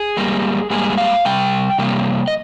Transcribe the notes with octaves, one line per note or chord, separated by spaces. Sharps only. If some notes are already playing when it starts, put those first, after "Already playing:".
Already playing: G#4
G#2 G3 A#3
G#2 G3 A#3 G#4
F5
C3 G3 G5
C3 G3 A#3
D#5